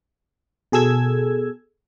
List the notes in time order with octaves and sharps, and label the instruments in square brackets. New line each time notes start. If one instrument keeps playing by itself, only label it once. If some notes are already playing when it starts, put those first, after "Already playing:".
[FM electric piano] B2 G#4 A4 E6 G#6